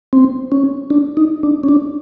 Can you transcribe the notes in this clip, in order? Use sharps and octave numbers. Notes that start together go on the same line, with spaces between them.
C4
C#4
D4
D#4
D4
C#4
D4